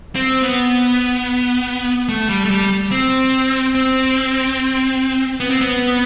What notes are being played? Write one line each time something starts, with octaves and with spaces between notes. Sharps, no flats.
C4
B3
A3
G3
A3
G3
C4
C4
B3
C4
B3